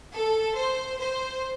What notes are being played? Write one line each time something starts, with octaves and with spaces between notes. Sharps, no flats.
A4
C5
C5